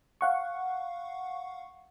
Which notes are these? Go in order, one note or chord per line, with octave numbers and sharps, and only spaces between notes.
F5 F#5 C#6